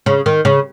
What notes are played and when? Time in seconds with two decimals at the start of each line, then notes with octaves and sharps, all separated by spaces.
0.06 C#3
0.26 D#3
0.45 C#3